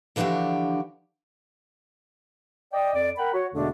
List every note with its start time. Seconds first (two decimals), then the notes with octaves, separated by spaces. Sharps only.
0.16 D3 E3 F3 D4 F#4 G4
2.73 D5 D#5 G5
2.95 F2 D5
3.17 A#4 F#5 G5 B5
3.33 F#4 C#5
3.54 E2 B2 D3 G#3 A3 D4